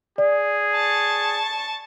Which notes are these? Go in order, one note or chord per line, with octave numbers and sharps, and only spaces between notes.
G#4 D5
A5 C#6